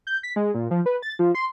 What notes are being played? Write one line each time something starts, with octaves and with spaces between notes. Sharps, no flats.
G6
B6
G#3
A#2
F3
B4
A6
F3
C6